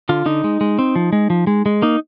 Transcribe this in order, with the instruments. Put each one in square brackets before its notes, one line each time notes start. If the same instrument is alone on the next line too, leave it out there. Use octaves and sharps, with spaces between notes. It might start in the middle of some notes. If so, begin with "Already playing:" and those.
[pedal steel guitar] D3 F4
D3 D#4
G#3
G#3
C4
F3
G#3
F3
G#3
G#3
A#3 D#4